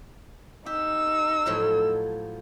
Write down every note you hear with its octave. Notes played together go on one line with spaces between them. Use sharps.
D#4 G4 E6
A2 F3 F#3